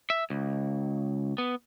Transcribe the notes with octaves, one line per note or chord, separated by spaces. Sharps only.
E5
C#2
B3